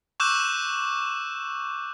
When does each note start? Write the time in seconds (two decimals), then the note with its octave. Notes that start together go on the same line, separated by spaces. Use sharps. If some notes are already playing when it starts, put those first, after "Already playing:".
0.20 C#6 D6 E6 F#6 G6 E7